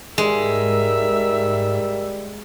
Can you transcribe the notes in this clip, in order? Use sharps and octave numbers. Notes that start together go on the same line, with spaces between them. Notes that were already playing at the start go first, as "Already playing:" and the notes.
G#2 G3 G#3 A#4 E5